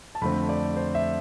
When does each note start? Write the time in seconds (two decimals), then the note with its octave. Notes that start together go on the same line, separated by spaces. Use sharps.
0.15 A5
0.21 F2 D3 A3 C4 B5
0.49 D5
0.76 C5
0.95 E5